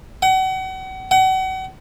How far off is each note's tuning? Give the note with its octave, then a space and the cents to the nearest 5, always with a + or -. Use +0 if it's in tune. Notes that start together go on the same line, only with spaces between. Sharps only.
F#5 +35
F#5 +35